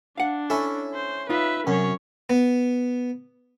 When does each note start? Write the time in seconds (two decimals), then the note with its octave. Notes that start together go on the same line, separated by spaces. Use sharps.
0.17 D4 F5 F#5
0.50 C#4 E4 A4
0.94 C5
1.29 D#4 F4 B4 E5
1.67 F#2 C3 C#4 C#5
2.30 B3